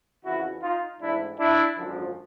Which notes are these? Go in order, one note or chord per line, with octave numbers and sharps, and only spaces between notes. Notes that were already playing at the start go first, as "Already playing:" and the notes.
F2 C#3 E3 E4 F#4
D#4 F4
A1 G#2 E3 D4 E4
D4 E4
G#1 F#2 D3 F3